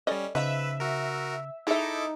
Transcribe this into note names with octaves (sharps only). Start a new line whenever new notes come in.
G3 C#4 A4 D5 D#5
C#3 F3 D#4 B4 E5
F#4 A#4
D#4 E4 G#4 A4 E5 D6